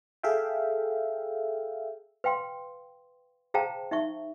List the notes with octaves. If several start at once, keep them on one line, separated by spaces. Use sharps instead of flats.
G#4 A4 E5 F5 G5
B4 F5 G5 C6
G#4 C5 F5 G5 A5 A#5
D#4 E5 C#6